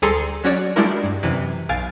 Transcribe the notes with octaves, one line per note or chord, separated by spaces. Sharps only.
D2 G3 G#4 A4 A#5 C6
F#3 C#4 F#4 C#5 D5
G3 G#3 D4 E4 F#4 A#4
G2
F#2 C3 E3
B1 F5 G#5 A6 D7